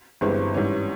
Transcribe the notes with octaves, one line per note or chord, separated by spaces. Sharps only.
G1 G2 E3 G#3 C4
G#2 E3 G3 C#4